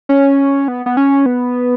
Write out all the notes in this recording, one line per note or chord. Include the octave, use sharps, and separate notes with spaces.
C#4
B3
B3
C#4
B3